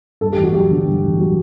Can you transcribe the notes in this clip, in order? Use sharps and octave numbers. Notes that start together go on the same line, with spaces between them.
G2 A4
A1 G4
F#4
F#3 G4
D3
G2
A1
F#3